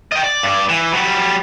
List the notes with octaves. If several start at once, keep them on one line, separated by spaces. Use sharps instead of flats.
D#5 G5
D5
G2 D5
E3
F#3 G3